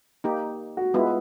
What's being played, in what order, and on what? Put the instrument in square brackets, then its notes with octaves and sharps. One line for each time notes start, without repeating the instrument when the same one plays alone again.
[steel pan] A#3 D#4 G4
[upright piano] F#4
[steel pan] G#3 B3 E4 [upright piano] F4